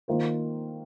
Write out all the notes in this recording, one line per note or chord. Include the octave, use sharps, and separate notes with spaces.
D#3 A#3 F4 C5